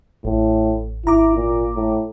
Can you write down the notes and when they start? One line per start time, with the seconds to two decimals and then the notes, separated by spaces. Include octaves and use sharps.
0.25 A1 A2
1.05 G#1 E4 A#5 D6
1.35 A#2
1.76 A2